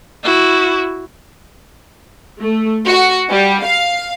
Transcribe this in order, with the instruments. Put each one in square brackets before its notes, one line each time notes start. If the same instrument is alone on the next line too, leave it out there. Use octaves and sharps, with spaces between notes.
[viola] E4 F#4
[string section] A3
F#4
G3
F5